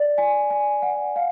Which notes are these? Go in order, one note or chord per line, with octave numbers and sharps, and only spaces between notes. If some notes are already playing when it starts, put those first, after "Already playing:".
Already playing: D5
G#5
G#5
F#5
F5